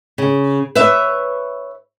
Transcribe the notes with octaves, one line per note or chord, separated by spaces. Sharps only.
C#3
B4 C#5 E5